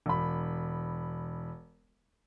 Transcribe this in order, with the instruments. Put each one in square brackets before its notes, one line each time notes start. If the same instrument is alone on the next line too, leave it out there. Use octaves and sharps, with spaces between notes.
[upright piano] E1 B5